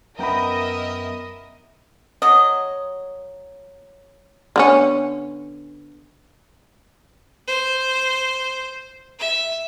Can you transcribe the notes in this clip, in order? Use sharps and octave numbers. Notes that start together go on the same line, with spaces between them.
F#2 B3 A#4 D#5 E5 G5 A#5 B5
F#3 D#5
D3 B3 C#4
C5
E5